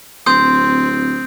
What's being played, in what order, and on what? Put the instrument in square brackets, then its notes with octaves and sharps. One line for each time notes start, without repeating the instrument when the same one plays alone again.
[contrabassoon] D1 [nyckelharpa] C4 [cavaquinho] C6 [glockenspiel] D#6 G6